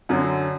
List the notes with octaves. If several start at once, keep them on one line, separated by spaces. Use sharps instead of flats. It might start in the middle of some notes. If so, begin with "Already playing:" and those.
F#2 D3 F#3